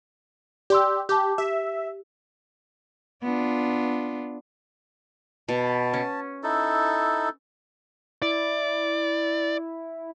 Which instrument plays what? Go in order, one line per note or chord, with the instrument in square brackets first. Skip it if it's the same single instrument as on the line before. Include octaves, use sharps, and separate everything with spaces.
[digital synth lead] G4 [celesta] D5 C6 E6
[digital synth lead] G4 [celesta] A5 D6 G6
[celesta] G4 [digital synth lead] E5
[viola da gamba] B3 D4 F4
[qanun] B2 [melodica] A5
[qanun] C#4
[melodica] D#4 E4 A4
[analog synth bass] E4 [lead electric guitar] D5